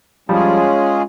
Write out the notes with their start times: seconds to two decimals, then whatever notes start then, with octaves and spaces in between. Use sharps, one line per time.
0.29 F3 G3 G#3 C#4 F4 G#4